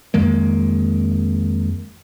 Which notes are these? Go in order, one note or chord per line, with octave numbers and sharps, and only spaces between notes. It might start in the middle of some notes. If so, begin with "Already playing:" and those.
F2 D#3 G#3 A#3